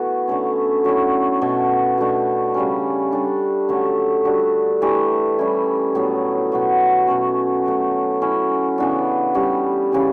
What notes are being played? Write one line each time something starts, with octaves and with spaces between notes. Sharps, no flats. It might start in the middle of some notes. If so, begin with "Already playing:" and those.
Already playing: E3 A3 B3 F#4
D3 A3 C#4
F#3 A3 C#4 E4
B2 A3 E4 A4
B2 A3 D4
C#3 G3 C#4
G3 D4 A4
D3 F#3 A3 C#4
G3 D4 F#4
E3 A3 D4 G4
G3 C#4 E4
A2 F#3 B3
B2 F#3 B3
B2 A3 C#4
B2 F#3 A3
F#3 C#4 E4
C#3 E3 B3 D4
G3 C#4 G4
C#3 E3 G3